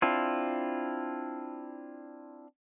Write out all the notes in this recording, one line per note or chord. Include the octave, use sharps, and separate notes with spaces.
C4 D4 E4 F4